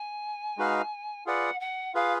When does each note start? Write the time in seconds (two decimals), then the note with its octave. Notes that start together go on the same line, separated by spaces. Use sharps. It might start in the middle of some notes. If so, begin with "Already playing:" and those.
Already playing: G#5
0.57 G#3 D#4 F#4 B4 F5
1.26 F4 G#4 B4 D5 F#5
1.60 F#5
1.94 F4 G#4 B4 F5